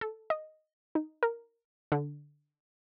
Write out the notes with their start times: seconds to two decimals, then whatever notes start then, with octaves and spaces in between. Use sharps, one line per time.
0.01 A4
0.30 D#5
0.95 D#4
1.23 A#4
1.92 D3